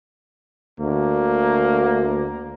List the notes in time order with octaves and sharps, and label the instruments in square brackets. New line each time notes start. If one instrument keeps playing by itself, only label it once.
[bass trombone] D2 [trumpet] A#3